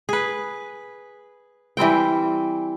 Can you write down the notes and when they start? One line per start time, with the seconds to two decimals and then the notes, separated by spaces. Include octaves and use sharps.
0.09 G#4 B4
1.77 E3 G3 C4 G5